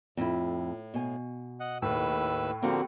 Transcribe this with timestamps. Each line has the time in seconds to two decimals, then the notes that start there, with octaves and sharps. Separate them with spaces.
0.17 F2 A2 E4
0.94 B2 G#5
1.60 D#5 F#5
1.82 D#2 A2 B4 E6
2.63 D3 F3 A#3 C4 F#4 G4